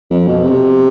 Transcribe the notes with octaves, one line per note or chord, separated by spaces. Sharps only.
F2
B2
C3